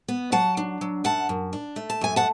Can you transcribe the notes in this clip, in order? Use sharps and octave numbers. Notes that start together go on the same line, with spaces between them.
B3
F#3 F#5 A5
D4
F#3
F#2 F#5 A5
F#2
D4
A3
A5
F#2 G#5
F#5 A5